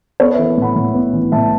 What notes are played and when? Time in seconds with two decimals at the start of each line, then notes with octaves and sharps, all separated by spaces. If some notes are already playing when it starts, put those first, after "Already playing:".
0.20 B3 A4 C#5
0.34 B4 E5
0.39 E3
0.58 A2 F#5 B5
0.76 A2
0.94 B3
1.14 E3
1.32 A2 E5 A5